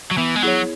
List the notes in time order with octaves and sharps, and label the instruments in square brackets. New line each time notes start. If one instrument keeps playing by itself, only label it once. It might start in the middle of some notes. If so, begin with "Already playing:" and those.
[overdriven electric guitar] F#3
[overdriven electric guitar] E3 [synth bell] B3
[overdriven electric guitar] G#3
[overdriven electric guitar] F#3 [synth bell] E4 G#4 C#5